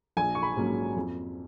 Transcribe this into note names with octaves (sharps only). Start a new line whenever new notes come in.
A#1 G#5
C#6
B5
G#2 F#3 A#3 C#4
F2